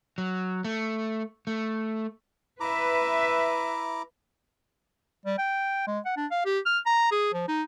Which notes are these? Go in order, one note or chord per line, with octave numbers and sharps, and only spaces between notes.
F#3
A3
A3
E4 B4 E5 A#5 D6
G3
G5
G#3
F#5
D4
F5
G4
F6
A#5
G#4
F3
D#4